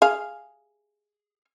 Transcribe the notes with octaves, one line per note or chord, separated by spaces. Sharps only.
G#4 F5